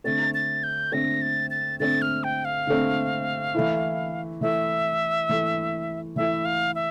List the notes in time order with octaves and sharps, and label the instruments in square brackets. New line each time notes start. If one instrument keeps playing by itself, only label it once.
[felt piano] D3 A3 C4 [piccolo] A6
[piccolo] A6
G6
[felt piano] D3 A3 C4 [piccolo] A#6
[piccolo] A6
A6
[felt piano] D3 A3 C4 [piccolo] A6
[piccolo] F6
G5
F5
[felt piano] D3 A3 C4
E3 A3 E4
[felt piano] E3 A3 E4 [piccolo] E5
[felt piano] E3 A3 E4
[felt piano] E3 A3 E4 [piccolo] E5
[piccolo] F5
E5